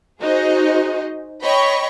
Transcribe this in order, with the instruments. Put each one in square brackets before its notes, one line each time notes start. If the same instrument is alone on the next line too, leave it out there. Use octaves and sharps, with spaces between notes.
[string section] D#4 F#4 G#4 C5 D#5
C#5 D#5 G5 B5 C#6